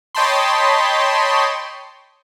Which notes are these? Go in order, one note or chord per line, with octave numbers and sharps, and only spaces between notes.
C#5 D#5 G5 A5 B5 C6